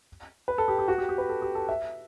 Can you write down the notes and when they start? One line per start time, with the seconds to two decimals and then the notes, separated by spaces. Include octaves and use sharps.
0.48 B4
0.58 A4
0.68 G4
0.79 G4
0.88 F#4
0.98 G4
1.09 G4
1.18 B4
1.29 A4
1.42 G4
1.55 A4
1.69 E5